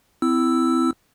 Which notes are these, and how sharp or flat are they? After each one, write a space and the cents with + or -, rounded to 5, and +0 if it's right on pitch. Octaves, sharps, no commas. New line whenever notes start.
C4 -35 E4 +5 E6 +0